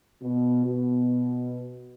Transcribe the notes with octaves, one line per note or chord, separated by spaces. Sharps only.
B2
B2